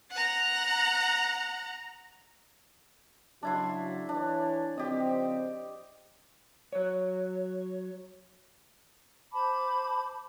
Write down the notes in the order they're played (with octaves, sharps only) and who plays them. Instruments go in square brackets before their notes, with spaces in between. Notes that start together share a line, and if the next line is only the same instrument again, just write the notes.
[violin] F#5 A#5
[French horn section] C#3 F#3 [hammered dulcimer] D4 E4 C6
[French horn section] E3 C#5 [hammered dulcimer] D4
[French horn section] C#3 F3 C4 [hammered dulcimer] G4 D#5
[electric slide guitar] F#3 C#5
[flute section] C5 A5 B5 D6